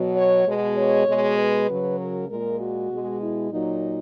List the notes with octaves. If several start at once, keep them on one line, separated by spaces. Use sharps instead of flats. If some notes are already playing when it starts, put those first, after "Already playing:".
Already playing: B2 F#3
C#5
B2 G#3
C#5
B2 G#3
B4
C#3 F#3
A#4
A#2 G#3 A#4
F#4
B2 G#3
E4
A#2 F#3 D#4